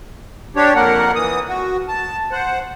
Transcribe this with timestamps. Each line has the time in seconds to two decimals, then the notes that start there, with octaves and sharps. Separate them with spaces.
0.56 D4 G4 C#5
0.76 F2 A#3 A#4 F#5
1.15 E3 D#6
1.48 F#4
1.88 A5
2.32 C5 F#5